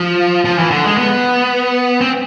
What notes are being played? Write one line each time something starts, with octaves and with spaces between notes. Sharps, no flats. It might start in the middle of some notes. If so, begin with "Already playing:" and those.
Already playing: F3
F3
E3
D3
G#3
B3
C4